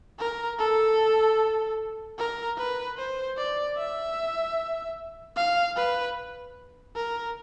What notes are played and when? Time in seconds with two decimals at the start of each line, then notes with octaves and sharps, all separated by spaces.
0.19 A#4
0.59 A4
2.18 A#4
2.58 B4
2.97 C5
3.37 D5
3.77 E5
5.36 F5
5.76 B4
6.95 A#4